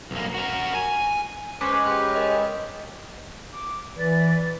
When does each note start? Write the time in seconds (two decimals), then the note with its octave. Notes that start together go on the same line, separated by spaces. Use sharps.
0.11 B1 A#3
0.34 F#4 A#4
0.75 G#5
1.61 G#3 C#4 B4 C5 D6
1.86 G4
2.16 A#4 D#5
3.52 D6
3.96 E3 B4 D5